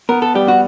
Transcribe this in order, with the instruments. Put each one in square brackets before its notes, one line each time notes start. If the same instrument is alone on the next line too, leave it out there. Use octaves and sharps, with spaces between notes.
[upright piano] B3 [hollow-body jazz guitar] A#4
[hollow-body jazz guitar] A4
[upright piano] G3 [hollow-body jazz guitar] G4
[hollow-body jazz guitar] F#4